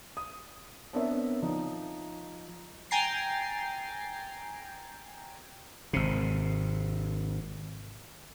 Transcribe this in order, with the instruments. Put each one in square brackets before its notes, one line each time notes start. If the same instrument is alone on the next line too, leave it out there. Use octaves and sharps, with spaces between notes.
[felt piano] D#6
B3 C4 D4 A#4 C#5 E5
F3 D#4
[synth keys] G5 G#5 A#5 A6 C7
[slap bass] G#1 C3